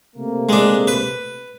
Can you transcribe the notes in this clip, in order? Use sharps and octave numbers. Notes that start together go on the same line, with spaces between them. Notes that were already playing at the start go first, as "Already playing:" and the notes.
C3 A3 A#3
G#3 D4
B4